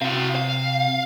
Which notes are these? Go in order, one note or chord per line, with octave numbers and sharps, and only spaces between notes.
C3 F#4 F5
F5